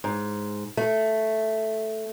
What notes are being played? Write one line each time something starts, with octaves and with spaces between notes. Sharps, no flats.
G#2
A3